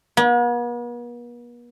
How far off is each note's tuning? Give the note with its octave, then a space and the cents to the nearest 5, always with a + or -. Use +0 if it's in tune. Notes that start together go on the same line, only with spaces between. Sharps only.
B3 -45